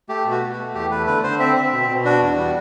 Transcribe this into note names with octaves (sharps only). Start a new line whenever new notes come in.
A3 G4
B2
F#4
B2
F#4
A3
E2 G4
A3 B4
D3 B4
D3 C5
C4 E5
C4
B2
B2
D4 F#4
E2
G3